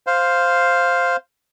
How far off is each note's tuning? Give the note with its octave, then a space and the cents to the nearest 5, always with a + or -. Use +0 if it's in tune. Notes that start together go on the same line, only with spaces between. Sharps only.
C5 +0 F5 +0